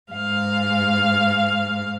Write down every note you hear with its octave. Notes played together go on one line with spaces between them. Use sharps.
G#2 F5